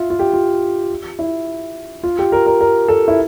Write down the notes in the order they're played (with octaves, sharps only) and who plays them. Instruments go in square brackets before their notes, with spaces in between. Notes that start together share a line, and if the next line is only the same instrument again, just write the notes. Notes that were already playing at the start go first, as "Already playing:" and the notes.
Already playing: [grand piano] F4 E5
F4
G4
F4
E4
F4
G4
A#4
A#4
A#4
A4
E4